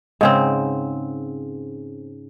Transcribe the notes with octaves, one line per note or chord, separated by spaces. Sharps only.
G#2 C#3 C4